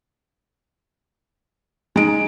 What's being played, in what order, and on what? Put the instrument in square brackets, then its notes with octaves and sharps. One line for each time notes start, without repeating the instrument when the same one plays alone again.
[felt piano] G#3 D7 [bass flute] D#4